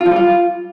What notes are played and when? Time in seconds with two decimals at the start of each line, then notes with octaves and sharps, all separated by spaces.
0.01 F4
0.06 F3
0.11 G3
0.16 F4